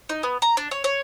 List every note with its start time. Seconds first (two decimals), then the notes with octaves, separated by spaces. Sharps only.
0.09 D#4
0.23 B3
0.42 A#5
0.57 D4
0.71 C#5
0.84 C#5